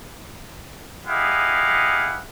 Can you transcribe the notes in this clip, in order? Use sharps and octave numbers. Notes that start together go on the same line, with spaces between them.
E4 G4 G#4 D#5 F5 F#5